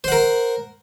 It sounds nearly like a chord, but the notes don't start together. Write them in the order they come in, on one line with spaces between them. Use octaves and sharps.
C5 F#5 A#4